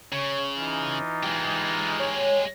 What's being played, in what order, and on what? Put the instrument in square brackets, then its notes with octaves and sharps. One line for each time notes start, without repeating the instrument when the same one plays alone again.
[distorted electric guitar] C#3 [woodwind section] C#5
[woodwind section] E3 D#4 F4
[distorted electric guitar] G#3 G4
[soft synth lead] C#5